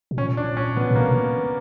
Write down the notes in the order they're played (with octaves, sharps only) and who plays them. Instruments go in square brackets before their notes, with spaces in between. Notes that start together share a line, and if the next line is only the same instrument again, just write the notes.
[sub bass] B2
[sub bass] A#2 [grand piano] C#4
[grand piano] D4
C#4
[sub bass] A#2 [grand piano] B3
[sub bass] A#2
[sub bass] B2 [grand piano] A#3
[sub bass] B2